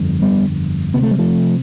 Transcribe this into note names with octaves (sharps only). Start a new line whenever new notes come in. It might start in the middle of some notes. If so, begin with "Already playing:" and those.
Already playing: G1 F2 D3
G3 B3
D2 C3 B3
A3
G3
F3 A3